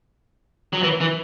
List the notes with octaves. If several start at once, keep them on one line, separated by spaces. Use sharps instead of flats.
F#3
E3
E3